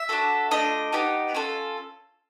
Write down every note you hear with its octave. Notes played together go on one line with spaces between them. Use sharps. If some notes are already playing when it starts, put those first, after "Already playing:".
Already playing: E5
D4 F#4 A4
A3 D4 F4 D#5
B3 D#4 G4
C#4 F4 A4